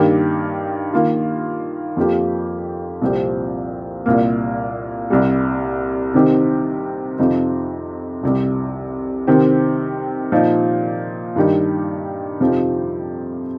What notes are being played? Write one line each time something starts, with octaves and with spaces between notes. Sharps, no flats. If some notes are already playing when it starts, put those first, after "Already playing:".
Already playing: G2 D#3 A#3 G4
D#3 A#3 F4
F2 F3 A#3 G4
C2 A#2 F3 C4 G4
C2 A#2 A#3
C2 C3 G3
C3 D#3 C4 D#4 G4
F2 C3 F3 D#4
C2 C3 G3
C3 D#3 C4 G4
A#2 F3 D#4
G2 D#3 G3 D#4 G4
F2 C3 F3 D#4 G4